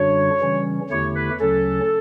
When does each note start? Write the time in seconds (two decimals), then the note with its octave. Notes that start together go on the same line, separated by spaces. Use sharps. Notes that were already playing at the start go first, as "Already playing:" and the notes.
Already playing: F#2 D3 G3 D4 F#4 C#5
0.40 C#3 E3 G3 C#4
0.90 E2 D3 A3 E4 G4 C#5
1.15 B4
1.40 D2 C#3 F#3 C#4 A4